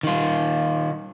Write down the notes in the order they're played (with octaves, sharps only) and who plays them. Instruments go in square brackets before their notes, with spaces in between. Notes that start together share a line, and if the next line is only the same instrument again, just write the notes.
[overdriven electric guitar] D#3 F4